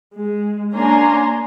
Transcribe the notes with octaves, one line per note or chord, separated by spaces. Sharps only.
G#3
A#3 C#4 D4 G#5 A#5 C6